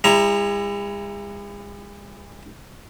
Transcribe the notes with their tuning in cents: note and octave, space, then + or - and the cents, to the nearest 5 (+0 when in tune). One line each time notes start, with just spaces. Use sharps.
G#3 -45 E4 +25 A#5 +0